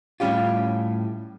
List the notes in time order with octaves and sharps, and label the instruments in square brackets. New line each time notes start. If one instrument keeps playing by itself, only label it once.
[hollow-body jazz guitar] A2 G3 C#4 F4 G4